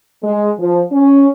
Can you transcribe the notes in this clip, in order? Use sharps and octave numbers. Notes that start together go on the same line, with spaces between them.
G#3
F3
C#4